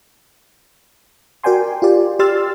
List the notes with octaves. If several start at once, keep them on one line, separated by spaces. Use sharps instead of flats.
F#4 A#4 D5 G5 G#5 C6
F4 G4 D5
G4 D5 C6 E6 F6 A6